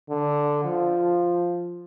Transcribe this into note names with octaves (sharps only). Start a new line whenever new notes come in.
D3
F3